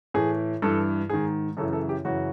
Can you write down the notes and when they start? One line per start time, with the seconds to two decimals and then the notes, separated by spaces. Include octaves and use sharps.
0.14 A2 E3 G#4
0.62 G2 E3 A4
1.10 G#2 D#3 G#4
1.57 F#2 C#3 E3 A4
1.73 A4
1.89 G4
2.05 F#2 C#3 E3 F#4